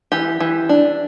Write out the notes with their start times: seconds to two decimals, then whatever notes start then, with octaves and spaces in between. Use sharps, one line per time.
0.12 E3 G4
0.40 E3
0.69 D4